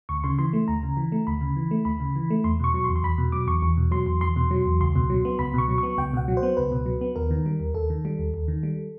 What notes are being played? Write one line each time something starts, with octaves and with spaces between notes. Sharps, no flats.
D2 C#6
C#3 C6
E3 C6
A3
D2 A#5
C#3
E3
A3
D2 B5
C#3
E3
A3
D2 B5
C#3
E3
A3
E2 C6
B2 C#6
F#3
C6
E2
C6
E2 B5
B2
F#3 D6
E2 C#6
E2
B2
F#3 C6
E2
E2 C6
B2
F#3
E2
C#2 C6
B2
F#3
B3
C#2 B5
B2 C#6
F#3
B3 C#6
C#2 G5
B2 F#5
F#3
C5
B3
C#2 B4
B2
F#3
B3
D#2 A#4
D#3
G3
D#2
D#2 A4
D#3
G3
D#2
D#2
D#3
G3